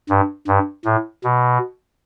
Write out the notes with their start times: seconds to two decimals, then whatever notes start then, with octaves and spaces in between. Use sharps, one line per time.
0.10 G2
0.47 G2
0.85 A2
1.24 B2